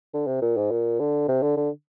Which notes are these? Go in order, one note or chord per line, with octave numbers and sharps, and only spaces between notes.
D3
C3
A#2
G#2
A#2
D3
C3
D3
D3